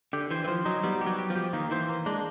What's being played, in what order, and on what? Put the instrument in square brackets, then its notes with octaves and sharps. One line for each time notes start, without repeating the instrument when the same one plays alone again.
[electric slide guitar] D3 [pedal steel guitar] G4
[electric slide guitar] E3 [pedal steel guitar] C5
[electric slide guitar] E3
[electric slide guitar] F3 [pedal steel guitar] C5
[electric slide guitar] F#3 [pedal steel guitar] D#4
[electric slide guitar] G3 [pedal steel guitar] B3
[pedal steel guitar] G4
[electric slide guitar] F#3
[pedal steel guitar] G4
[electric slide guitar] F3
[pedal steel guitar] G4
[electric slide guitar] D#3 [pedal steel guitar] A#3
[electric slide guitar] E3 [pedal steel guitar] C5
[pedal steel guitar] A#3
[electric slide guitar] G#3 [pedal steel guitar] D4